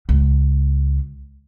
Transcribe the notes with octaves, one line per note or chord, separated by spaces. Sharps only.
C#2